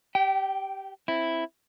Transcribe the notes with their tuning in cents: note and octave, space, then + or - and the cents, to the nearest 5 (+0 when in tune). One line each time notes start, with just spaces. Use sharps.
G4 +0 G5 -30
C4 +0 E4 +0